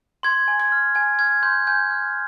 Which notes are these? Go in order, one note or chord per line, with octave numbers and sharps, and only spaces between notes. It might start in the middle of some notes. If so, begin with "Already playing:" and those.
C6 G#6
G#5
G#6
F6
G#5 G#6
F6 G#6
C6 G6
G#5 G6
F6